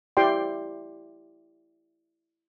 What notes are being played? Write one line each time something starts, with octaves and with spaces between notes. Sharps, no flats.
E4 G4 D5 G5 C6